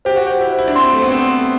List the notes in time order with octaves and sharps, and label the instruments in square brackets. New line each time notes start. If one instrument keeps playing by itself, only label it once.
[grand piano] G4 [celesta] C5
[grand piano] F#4
G4
[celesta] C5
[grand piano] E4
[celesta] C5
[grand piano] E4
D4
[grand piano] C4 [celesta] C6
[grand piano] A3
[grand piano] B3 [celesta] C5
[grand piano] C4
[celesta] C6